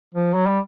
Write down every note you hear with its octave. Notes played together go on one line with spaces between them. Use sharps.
F3
F#3
G3